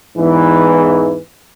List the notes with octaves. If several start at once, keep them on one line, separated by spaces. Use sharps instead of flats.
E2 G#2 E3